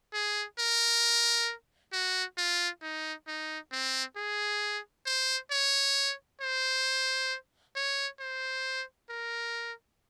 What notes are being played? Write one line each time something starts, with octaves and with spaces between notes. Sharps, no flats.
G#4
A#4
F#4
F4
D#4
D#4
C4
G#4
C5
C#5
C5
C#5
C5
A#4